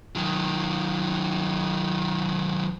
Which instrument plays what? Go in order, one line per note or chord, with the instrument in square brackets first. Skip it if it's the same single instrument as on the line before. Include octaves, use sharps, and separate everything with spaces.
[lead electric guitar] D#3 F#3